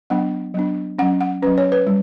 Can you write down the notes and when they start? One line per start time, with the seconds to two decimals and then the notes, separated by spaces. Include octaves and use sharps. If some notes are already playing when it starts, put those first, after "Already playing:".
0.10 F#3 B3 D4 F#5
0.54 F#3 B3 D4
0.98 C#4 F#5
1.02 F#3
1.21 F#5
1.42 C#4 B4
1.47 F#3
1.58 C#5
1.72 B4
1.87 G3